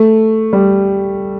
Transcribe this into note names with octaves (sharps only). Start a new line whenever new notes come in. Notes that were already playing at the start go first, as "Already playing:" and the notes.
Already playing: A3
G3